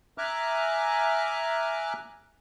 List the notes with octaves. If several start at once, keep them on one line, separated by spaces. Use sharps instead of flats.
E5 G#5 A#5 D6 F6 F#6